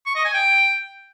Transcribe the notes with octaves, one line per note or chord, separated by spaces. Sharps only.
C#6
D#5
G#5
G5